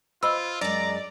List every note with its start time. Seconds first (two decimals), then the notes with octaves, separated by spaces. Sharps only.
0.23 F4 C5 D#5 B5 E6
0.61 F#2 G#3 D5 A#5